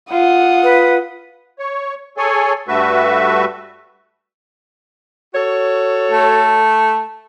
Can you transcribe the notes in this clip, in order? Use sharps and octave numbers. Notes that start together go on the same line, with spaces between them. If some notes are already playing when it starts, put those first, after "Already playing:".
F4 F#5 D#6
B4
C#5
G#4 A4 C#5 G#5
G2 A3 F#4 B4 E5
F#4 A4 C#5
A3